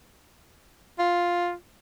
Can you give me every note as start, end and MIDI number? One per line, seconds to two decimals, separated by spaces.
0.99 1.53 65